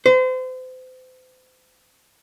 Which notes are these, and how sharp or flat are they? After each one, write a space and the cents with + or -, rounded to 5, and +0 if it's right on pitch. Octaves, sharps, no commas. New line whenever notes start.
C5 -35